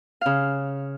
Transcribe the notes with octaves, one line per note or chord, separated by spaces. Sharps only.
C#3 F5